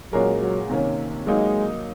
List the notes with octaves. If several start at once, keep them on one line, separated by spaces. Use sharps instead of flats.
A#2 F#3 G#3 C#4 F#4 A#4
F#3
C3 D#3 A#3 C#4
F#3 G#3 A#3 D#4